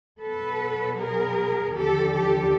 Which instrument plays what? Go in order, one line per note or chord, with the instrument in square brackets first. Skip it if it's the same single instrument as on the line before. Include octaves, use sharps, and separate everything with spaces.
[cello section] B2 F#3 B3 A4 B4
G#4 A#4
D#2 D3 F3 G4 A4
G4 A4